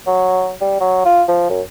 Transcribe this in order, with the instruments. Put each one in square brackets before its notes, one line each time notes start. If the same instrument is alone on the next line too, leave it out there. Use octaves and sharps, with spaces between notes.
[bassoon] F#3
G3
F#3
F4
F3
F#2